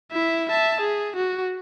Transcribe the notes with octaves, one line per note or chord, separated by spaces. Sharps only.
E4 E5
E5 A5
G#4
F#4